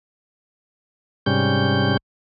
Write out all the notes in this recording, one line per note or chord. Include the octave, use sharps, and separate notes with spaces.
G#2 C3 G3 C#4 G6